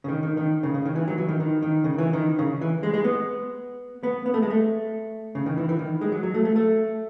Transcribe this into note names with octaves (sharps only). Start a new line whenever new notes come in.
C#3
D#3
D#3
D#3
C#3
C#3
D#3
E3
F#3
E3
D#3
D#3
D#3
C#3
E3
D#3
C#3
E3
G#3
G#3
B3
B3
B3
A3
G#3
A3
C#3
D#3
E3
E3
D#3
G#3
F#3
F#3
A3
A3
A3